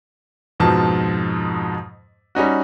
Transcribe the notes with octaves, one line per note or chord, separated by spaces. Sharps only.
F2 G#2 B2 F3 A5
G3 C#4 D#4 F#4